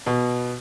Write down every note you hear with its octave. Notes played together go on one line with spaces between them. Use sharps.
B2